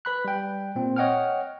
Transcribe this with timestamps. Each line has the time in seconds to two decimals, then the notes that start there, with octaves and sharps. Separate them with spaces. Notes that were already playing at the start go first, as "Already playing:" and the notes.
0.05 B4 B5 F#6
0.25 G3 G5
0.75 A#2 C4
0.96 C#5 D#5 F#5 G5 F6